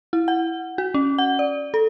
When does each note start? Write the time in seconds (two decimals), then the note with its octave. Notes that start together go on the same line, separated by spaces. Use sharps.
0.13 E4
0.28 F#5
0.78 F#4
0.94 C#4
1.18 F#5
1.39 D5
1.74 A4